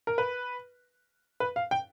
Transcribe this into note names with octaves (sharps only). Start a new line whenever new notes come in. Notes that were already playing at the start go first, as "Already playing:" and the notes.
A#4
B4
B4
F5
G5